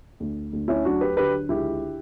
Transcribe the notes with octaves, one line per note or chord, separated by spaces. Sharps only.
D2
D2
C#4 E4
F#3 D4 F#4
G4 B4
D3 G4 B4
C#2 E4 G4